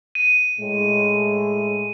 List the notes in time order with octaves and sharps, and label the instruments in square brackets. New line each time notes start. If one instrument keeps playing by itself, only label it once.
[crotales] D#7
[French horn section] A2 G#3